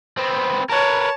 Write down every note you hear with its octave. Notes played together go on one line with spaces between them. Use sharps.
B3 C4
A#4 B4 C#5 A5